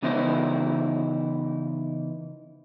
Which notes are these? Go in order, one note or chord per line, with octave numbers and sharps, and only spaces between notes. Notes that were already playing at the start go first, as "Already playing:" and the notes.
C#3 E3 B3 D#4 E4 C5